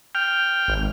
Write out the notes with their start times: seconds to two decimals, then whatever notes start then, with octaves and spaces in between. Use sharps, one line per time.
0.15 G5 F6
0.68 G#1